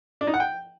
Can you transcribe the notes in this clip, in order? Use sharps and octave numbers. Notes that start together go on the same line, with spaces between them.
D4
D#4
F#5
G5